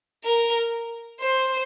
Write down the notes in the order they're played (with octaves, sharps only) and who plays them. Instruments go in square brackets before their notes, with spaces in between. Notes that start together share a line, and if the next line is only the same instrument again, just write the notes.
[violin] A#4
C5